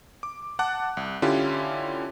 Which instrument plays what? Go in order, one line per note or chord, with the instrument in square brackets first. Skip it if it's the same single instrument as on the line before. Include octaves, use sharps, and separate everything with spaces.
[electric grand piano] D6
F#5 A5 D6 F#6
C2
D3 C#4 E4 F4 G4